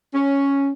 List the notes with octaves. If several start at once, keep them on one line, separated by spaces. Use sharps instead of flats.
C#4